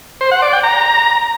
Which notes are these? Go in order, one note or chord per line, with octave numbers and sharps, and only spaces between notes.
C5
F#5
D5
G5
A#5